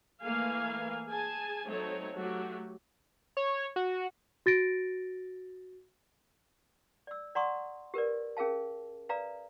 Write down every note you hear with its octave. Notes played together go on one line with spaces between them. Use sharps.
E3 A3 A#3 F5 G#5
G#4 G#5 A5
F#3 A3 C4 D#4 A4 C#5
F#3 A3 F#4 G4
C#5
F#4
F#4 A6 A#6 D7
D5 E6
D5 F#5 A#5 C6 C#6 D#6
G4 A#4 B4 D5
C#4 G#4 A#4 F5 A5
B4 D5 F5 A#5 D#6